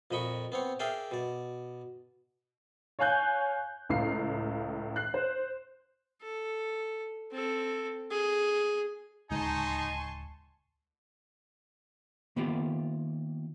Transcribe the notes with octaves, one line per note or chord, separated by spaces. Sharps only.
F2 A#2 D#5 B5 C#6
B3 C4 C#5
G#4 A#4 D5 E5 F5 G5
B2 D5
C#5 F5 G#5 F#6 G6
C#2 A2 F5 C7
F#6 C7
C5
A4
C4 A4
G#4
D1 C#2 G#3 D#4 G#5 A5 C6 C#6
D#3 A#3 B3 F4 G4